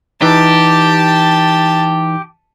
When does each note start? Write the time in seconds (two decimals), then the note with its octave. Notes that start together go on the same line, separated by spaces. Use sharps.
0.22 E3 D#4 G4 A5